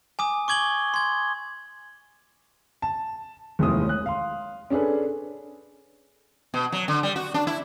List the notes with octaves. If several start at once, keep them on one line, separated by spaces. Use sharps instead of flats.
G#5 D6 D#6
C#6 D6 G#6 F#7 G7
C6 G#6
A5
F1 D#2 A2 G#3 E4 D#6
C#5 F#6
F5 C6
C#4 D4 G#4 A4 B4
B2
F#3
D3
G3
F#4
D4
E4